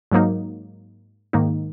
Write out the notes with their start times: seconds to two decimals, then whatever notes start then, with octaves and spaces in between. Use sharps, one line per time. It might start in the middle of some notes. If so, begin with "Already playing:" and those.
0.12 G#2 F#3 A#3 D#4
1.33 G#2 D#3 A#3 D#4